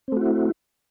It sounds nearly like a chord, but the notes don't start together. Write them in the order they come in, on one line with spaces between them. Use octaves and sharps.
C4 A3 F#4 E4